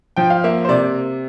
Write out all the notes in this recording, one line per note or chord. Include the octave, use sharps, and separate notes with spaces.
F3 G5
F5
A#3 E5
C5
C3 D5